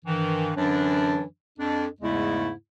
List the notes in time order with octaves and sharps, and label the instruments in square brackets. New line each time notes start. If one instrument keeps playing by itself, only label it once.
[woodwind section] G2 D#3 E3
F#2 D3 E3 F#3 D4
F2 D4
E2 G#2 C#3 G#3 A3 E4